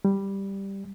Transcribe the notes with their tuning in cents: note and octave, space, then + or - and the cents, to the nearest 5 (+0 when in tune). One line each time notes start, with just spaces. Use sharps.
G3 +0